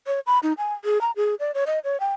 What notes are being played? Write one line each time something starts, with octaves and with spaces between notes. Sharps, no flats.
C#5
B5
D#4
G#5
G#4
A#5
G#4
D5
C#5
D#5
C#5
G5